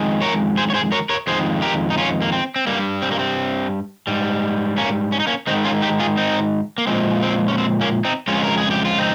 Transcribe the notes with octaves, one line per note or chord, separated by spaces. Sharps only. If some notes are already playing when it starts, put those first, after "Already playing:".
Already playing: F2 D#3 G#3
A#4 C#5
G#4 C5
C#5
G#4 C5
A#4 C#5
A#4 C#5
F2 D#3 G#3 G#4 C5
G4 A#4
D#4
C#4 F4
A#3
C4
C4
G2 G3 A#3
C4
A#3
C4
G#2 G3
A#3 C#4
C#4
D#4
A#3 C#4
G#2 D#3 G#3 C4 D#4
C#4 F4
D#4 G4
F4 G#4
C4 D#4
A#3
A#2 F3 G#3 C4
C4
C#4
C4
A#3 C#4
C4 D#4
F2 C#3 G#3 C#4 F4
A#4
G#4
G4
F4
C4 D#4